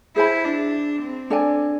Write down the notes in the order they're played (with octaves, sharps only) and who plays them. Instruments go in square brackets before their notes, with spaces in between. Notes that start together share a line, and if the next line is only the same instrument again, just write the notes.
[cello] E4 [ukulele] G#4 C5 G#5 B5
[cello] D4
C4
[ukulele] D4 A4 D5 G#5